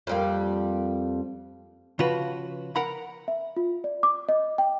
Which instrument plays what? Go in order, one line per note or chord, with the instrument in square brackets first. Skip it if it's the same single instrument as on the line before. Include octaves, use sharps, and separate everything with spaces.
[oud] F2 G3 A#3
[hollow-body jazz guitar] C#3 F3 F4 F#4 B4
A#4 F#5 A#5 B5
[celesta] E5
F4
D5
D6
D#5
G5